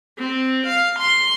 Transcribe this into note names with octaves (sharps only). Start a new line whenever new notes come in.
C4
F5
C6